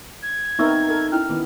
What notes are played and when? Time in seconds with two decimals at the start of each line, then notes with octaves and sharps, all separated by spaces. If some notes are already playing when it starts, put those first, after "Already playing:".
0.23 G#6
0.59 B3 C4 D#4 A#4 E5 C#6 E6
0.88 A4 A#4
1.12 C#4 E4 F6
1.29 D#3 B3